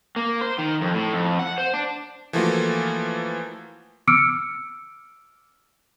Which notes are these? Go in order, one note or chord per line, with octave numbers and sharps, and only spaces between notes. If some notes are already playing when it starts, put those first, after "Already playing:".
A#3
C5
D#3
F2
A2
F2
F#5
C5
D4
E3 F3 A3 A#3 F4 F#4
D6 E6 F6 C#7 D7